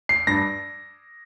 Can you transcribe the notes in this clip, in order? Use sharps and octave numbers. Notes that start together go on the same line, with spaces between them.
C7
G2 A#6